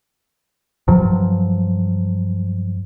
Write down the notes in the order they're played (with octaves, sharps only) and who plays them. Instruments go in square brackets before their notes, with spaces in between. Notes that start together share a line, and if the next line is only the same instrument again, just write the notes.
[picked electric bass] G2 F3 F#3